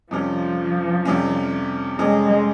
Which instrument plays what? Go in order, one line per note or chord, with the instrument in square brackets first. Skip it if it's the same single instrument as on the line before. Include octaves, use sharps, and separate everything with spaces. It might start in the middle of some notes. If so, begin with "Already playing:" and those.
[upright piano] F2 C3 G3 C#4 [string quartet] F3
[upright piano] F2 C3 G3 C#4
[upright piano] F2 C3 G3 C#4 [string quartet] G#3